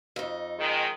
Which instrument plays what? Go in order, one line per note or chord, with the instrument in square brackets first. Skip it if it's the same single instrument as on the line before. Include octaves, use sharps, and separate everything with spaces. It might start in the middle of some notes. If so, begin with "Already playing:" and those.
[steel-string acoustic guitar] F2 D#4
[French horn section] D#3 G#3